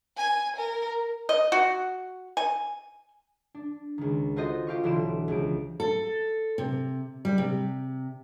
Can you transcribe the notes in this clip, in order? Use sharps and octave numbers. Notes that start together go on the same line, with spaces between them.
G#5
A#4
D#5
F#4
G#5
D4
C#2 D#3
F4 F#4 A4 C5 D#5
F4 G4 F5 C#6
B1 D3 E3 C6 D7 E7
C#2 F3 D7
A4
C3
G3
C3